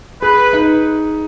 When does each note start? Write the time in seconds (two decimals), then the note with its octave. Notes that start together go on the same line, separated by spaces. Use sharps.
0.22 G#4 B4
0.53 D#4